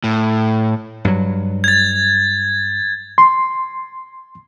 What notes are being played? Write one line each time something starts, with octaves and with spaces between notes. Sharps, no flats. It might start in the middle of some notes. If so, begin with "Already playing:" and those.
A2
G2 F#3
G#6 A6
C6